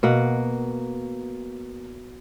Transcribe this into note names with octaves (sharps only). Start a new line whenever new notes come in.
B2 A#3 F#5